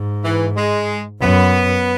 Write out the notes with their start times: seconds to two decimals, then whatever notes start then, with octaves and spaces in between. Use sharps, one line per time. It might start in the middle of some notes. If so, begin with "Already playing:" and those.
Already playing: G#2
0.24 E3
0.56 G#3
1.20 F#2 B3